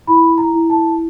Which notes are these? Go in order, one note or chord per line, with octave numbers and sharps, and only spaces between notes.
E4 B5
A#5
E4
A5